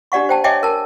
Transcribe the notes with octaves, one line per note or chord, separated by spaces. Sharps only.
D4 G4 D5 F#5 C#6
C5 G5 A5
C#5 D#5 E5 G5 G#5 D6
A#4 A5